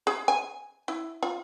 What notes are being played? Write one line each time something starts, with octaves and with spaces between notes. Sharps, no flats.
G#4
G#5
E4
F4